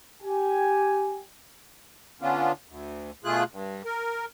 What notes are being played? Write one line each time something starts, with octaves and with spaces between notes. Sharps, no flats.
G4 G#5
D3 B3 C#4 D4 F4
D2
B2 A3 F4 G#4 F#6
G2
A#4